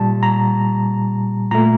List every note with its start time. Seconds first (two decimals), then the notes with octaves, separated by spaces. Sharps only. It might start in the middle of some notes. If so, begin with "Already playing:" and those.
Already playing: A#2 G3 A5
0.23 A#5
1.51 A#2 A3 A#5